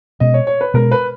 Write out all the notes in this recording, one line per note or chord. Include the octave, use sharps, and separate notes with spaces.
B2 G#3 C#4 D#5
C#5
C#5
B4
B2 G#3 C#4 A#4
B4